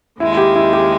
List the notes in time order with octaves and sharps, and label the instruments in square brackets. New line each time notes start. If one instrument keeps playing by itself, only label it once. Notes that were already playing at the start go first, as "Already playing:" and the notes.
[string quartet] D#2 C#3 G#3 [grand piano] E4
[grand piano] E4
G4
E4
G4